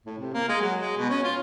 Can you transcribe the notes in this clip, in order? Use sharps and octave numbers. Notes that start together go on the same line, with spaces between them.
A2
C3
A#3
G#3
F#3
G#3
B2
C#4
F4